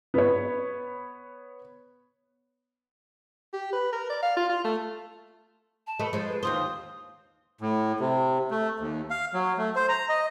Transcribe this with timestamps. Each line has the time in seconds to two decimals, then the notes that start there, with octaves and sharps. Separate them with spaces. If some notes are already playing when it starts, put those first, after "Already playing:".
0.14 B3 B4 C#5
3.53 G4
3.73 B4
3.93 A#4
4.10 D5
4.23 F5
4.37 F4
4.49 F4
4.64 A3
5.87 A5
6.00 A3 B4 D#5
6.13 F3 G#3 C5
6.27 B4
6.43 D#2 F4 C5 D#6
7.61 A2
8.00 C3
8.51 A3
8.80 D#2
9.10 F5
9.34 F#3
9.58 A3
9.76 C5
9.89 A#5
10.09 D#5